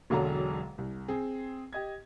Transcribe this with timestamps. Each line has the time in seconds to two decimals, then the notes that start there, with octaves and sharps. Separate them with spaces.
0.10 E1 B1 D3 F#3 A4 A#5
0.78 C2
1.08 C4 G#4
1.73 G4 D#5 G#6